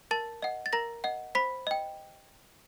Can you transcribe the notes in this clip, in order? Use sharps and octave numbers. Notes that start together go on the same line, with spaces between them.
A#4 A5 A6
D#5 F#5
A6
A#4 A#5 A#6
D#5 F#5
C5 B5 B6
D#5 G5